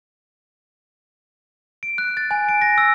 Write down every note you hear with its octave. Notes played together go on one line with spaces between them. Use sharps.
D7
F#6
A6
G#5
D7
A#6
E6